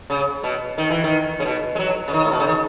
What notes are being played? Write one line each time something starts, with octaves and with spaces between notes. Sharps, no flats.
C#3
B2
D#3
E3
D#3
C#3
B2
G#3
F#3
C#3
D#3
A2
B2
C#3
D#3